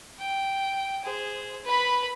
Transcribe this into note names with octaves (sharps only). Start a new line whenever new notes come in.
G5
G#4 C5
B4 B5